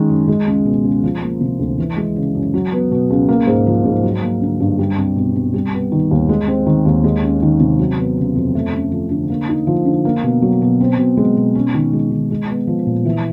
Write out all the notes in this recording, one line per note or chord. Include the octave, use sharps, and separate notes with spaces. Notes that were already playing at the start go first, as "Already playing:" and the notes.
Already playing: D#3 G#3 C#4
F#2
G#3
C#2
B2
C#2
F3
A#3
C3
D2
E3
G#3
C#3
F#2
F#3
B3
B2
C#2
A#3
G#2
F3
G#2
F#3
A#3
D3
G2
G3
C2
B2
C2
G3
B3
D#3
D#2
G#3
C4
D#3
D#2
G#3
C#4
D#3
C3
F#3
B3
C#3
F2
A3
C#4
F3
D3
A#3
D#4
F3
D3
A#3
B2
F#3
B2
C4
B2
G#3
B2
C#4
D#3
G#3
D#3
G#3
B3
F3
A#2
E3